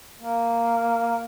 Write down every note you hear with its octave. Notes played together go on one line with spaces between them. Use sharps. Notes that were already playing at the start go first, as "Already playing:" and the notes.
A#3